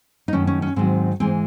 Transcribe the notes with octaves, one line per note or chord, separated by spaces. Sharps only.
D#4
F#2 D#3 A3 C#4
C#4
C#4
G#2 D#3 F#3 C4
G#2 E3 G#3 C4